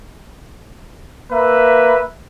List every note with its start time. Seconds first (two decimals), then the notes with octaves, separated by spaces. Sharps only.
1.31 A#3 B4 E5